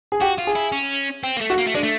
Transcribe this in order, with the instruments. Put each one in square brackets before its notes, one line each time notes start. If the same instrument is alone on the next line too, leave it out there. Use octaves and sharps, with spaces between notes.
[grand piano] G#4
[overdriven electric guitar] F#4 [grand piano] G4
[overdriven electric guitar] F4
[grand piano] G#4
[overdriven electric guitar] E4
C#4
C4
A#3
A3
[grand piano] F#4
[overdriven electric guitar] A#3
A3
[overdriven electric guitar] G#3 [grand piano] D4
[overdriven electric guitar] A3